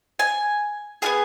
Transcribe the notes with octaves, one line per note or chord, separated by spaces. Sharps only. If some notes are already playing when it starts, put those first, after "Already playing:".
G#5
B3 F4 G#4 G#5